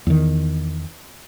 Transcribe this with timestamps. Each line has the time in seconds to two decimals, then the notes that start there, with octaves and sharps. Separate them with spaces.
0.07 E2 D#3